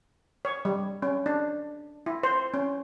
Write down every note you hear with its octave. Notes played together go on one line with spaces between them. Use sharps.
C#5
G3
C#4
D4
E4
C5
C#4